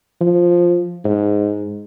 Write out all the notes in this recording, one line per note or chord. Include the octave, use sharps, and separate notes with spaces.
F3
G#2